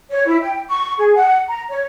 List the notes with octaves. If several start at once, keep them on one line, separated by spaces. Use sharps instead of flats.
C#5
E4
G5
C#6
G#4
F#5
A#5
C#5